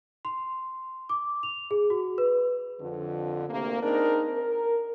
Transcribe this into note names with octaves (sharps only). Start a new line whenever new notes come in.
C6
D6
F7
G#4
F#4
B4
F2 D3
D2 C3 A#3
C4 D4 D#4 G#4 A#4
A#4